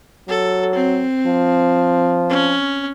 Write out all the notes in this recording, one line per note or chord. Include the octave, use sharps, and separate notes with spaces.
F#3 A4
C4
F3
C#4